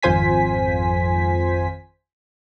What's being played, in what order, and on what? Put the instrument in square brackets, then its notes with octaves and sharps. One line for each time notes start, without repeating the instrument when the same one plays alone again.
[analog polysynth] G#1 F2 F4 C5 G#5 B6